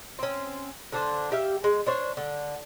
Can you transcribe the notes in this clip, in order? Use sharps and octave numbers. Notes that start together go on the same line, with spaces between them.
C4 C#4
D3 D4 C5
G4 E5 F5
G#3
D4 C5 C#5
D3